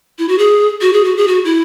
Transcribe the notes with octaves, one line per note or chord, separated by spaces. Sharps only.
E4
F#4
G#4
F#4
G#4
F#4
G#4
F#4
E4